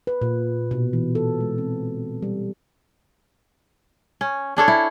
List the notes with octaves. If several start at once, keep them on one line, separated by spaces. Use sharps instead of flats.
B4
A#2
B2
E3
A4
G#3
C4
G3
C#4
C#4 D4 A4 C#5
E4